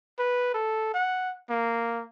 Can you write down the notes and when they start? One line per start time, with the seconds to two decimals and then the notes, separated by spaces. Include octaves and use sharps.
0.19 B4
0.55 A4
0.94 F#5
1.50 A#3